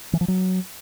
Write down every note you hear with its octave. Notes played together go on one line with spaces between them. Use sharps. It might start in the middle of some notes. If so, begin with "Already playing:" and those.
E3
F3
F#3